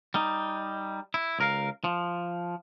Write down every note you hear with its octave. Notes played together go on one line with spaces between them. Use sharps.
G3 D#4
E4
C#2 A#4 F5
F3